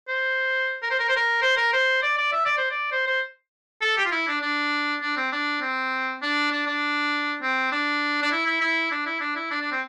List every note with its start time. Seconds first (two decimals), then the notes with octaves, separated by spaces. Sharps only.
0.08 C5
0.82 A#4
0.91 C5
0.99 A#4
1.09 C5
1.16 A#4
1.42 C5
1.57 A#4
1.73 C5
2.03 D5
2.18 D5
2.32 E5
2.45 D5
2.58 C5
2.71 D5
2.92 C5
3.07 C5
3.82 A4
3.97 G4
4.05 F4
4.12 E4
4.28 D4
4.42 D4
5.02 D4
5.17 C4
5.32 D4
5.61 C4
6.22 D4
6.51 D4
6.67 D4
7.42 C4
7.72 D4
8.22 D4
8.32 E4
8.47 E4
8.61 E4
8.91 D4
9.06 E4
9.21 D4
9.36 E4
9.51 D4
9.61 D4
9.72 C4